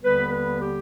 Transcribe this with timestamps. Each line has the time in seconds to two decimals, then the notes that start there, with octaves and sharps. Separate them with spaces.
0.02 D#2 D3 G3 B3 B4
0.32 B4
0.61 G4